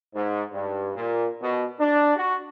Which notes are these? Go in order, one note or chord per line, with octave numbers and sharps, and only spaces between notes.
G#2
G2
A#2
B2
D4
F#4